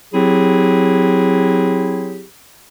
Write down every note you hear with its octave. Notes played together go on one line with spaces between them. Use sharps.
F#3 C4 E4 G4 G#4